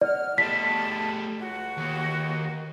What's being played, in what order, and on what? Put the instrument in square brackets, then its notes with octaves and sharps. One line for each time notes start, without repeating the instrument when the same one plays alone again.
[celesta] D5 [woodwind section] F#5 F6
[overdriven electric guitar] G3 A3 [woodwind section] D#5 A5 [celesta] B6
[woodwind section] C#2 F#4
[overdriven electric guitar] D#2